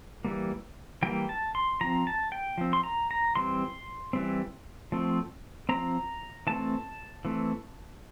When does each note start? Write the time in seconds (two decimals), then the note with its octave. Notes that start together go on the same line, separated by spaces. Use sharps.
0.25 E3 G3 A#3
1.02 E3 G3 A#3 G5
1.29 A5
1.55 C6
1.81 F3 C4 A#5
2.07 A5
2.32 G5
2.58 F3 C4
2.73 C6
2.84 A#5
3.11 A#5
3.36 E3 G3 C4 C6
4.13 E3 G3 C4
4.92 F3 A3 C4
5.69 F3 A3 C4 A#5
6.47 E3 A3 C4 A5
7.25 E3 A3 C4